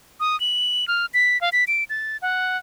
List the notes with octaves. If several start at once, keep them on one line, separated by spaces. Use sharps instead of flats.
D#6
F#7
F6
B6
F5
B6
D7
A6
F#5